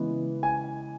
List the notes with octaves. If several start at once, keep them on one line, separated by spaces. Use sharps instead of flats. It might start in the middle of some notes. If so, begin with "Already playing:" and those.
Already playing: C#3 E3 G#3 B3
G#5